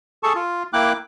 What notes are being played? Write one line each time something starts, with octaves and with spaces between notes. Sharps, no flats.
G#4 A4 A5 C#6
F4
A#3 E4 G5 D6 F#6